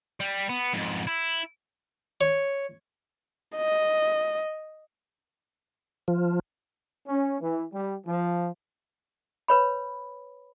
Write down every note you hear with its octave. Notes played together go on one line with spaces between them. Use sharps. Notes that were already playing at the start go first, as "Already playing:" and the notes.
G3
B3
F2 G#2
E4
C#5
D#5
F3
C#4
E3
G3
F3
B4 C#5 B5